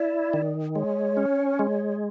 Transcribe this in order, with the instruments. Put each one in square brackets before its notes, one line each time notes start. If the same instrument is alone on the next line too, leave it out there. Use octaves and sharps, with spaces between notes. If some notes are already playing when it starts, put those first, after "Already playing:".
Already playing: [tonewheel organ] E4 [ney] D5
[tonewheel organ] D#3
[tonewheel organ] G#3 [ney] C#5
[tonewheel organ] C#4
G#3